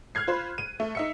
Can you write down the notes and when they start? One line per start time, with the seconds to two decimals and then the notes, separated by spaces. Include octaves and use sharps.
0.15 F6 F#6 G#6 C7
0.27 F4 C5 B5
0.58 D#7
0.80 A3
0.95 D#4 E5 C#7